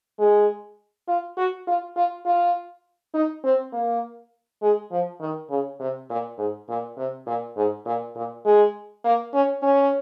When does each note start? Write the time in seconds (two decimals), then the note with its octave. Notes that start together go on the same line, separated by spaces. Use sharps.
0.19 G#3
1.08 F4
1.37 F#4
1.67 F4
1.96 F4
2.25 F4
3.14 D#4
3.44 C4
3.72 A#3
4.62 G#3
4.91 F3
5.20 D#3
5.50 C#3
5.80 C3
6.10 A#2
6.38 G#2
6.68 A#2
6.97 C3
7.27 A#2
7.57 G#2
7.85 A#2
8.16 A#2
8.45 G#3
9.04 A#3
9.33 C#4
9.63 C#4